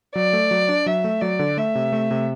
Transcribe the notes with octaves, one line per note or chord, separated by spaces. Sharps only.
F#3 D5
A3
F#3
D4
F#3 E5
A3
F#3 D5
D3
A3 E5
C3
A3
C3